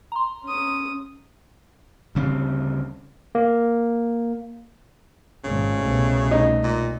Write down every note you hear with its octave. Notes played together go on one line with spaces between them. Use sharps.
A#5 C6
C#4 D#6
D2 C#3 G3 C4
A#3
G#1 A#2 C#3
C2 B2 A3
D#4
A#2